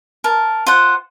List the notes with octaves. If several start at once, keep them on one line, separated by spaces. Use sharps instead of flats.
A#4 A5
F4 C5 F#5